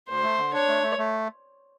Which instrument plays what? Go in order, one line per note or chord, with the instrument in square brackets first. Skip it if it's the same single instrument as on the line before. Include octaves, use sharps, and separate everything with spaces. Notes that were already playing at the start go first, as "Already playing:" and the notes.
[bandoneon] D2 [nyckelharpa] C5
[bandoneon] A3
D3
[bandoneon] D4 [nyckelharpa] C#5
[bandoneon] A3
A3
A3